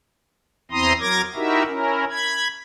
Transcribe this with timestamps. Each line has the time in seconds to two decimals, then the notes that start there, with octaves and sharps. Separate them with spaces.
0.71 E2 C4 E4 A#5 C6 D#6
1.00 F#3 A#4 D6 G#6 A#6
1.35 D#4 E4 F#4 G4 A#4 E5
1.67 C#4 E4 A#4
2.10 B5 G#6